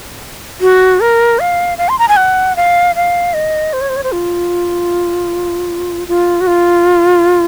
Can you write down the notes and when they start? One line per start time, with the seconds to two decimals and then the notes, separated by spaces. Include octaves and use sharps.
0.61 F#4
1.00 A#4
1.40 F5
1.78 F5
1.89 C6
1.99 A#5
2.08 G#5
2.17 F#5
2.56 F5
2.96 F5
3.34 D#5
3.73 C5
3.81 C#5
3.89 C5
3.96 C#5
4.04 C5
4.13 F4
6.08 F4
6.41 F#4
6.47 F4